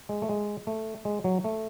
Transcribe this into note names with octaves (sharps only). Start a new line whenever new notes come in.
G#3
A3
G#3
A3
G#3
F#3
A3